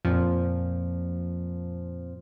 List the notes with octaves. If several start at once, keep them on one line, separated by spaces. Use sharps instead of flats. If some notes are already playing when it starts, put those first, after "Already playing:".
F2 A#2 F3